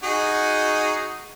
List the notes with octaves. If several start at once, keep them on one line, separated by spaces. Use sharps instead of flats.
D#4 F#4 G#4